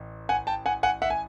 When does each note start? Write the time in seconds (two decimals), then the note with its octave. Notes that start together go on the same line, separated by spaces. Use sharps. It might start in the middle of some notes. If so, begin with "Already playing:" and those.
Already playing: A1
0.29 F#5 G#5
0.47 G5 A5
0.66 F#5 G#5
0.83 F#5 G#5
1.02 E5 F#5
1.10 G#5